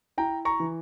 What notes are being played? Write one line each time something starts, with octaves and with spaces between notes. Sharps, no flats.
E4 G5 A#5
A#5 C#6
E3